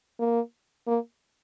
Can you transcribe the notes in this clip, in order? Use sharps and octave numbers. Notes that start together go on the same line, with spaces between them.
A#3
A#3